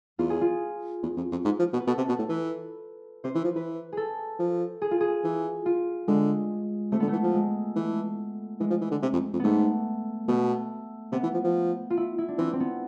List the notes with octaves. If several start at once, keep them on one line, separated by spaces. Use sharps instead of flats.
E2 F4
G#4
F4
E2
F2
F2
G#2
F3
B2
B4
B2 A4
C3
B2
A2
E3 B4
C3 C5
E3 B4
F3
E3 B4
G#4 A4
F3
G#4
F4
G#4
E3
F4
D3 G#3
C3 A3
D3 B3
E3 A3
F3
G#3
E3 A3
E3 G#3
F3
E3
D3
C3
F2
F2
G#2 A3 B3
B2 A3
C3 B3
E3
F3
F3
F4
E4
E4
D4
E3 C4
C4
B3